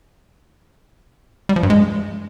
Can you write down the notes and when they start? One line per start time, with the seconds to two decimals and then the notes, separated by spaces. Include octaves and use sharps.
1.49 G3
1.56 F3
1.63 G2
1.70 G#3